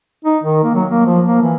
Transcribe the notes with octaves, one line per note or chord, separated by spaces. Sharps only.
D#4
D#3
A#3
F#3
A#3
F3
A#3
E3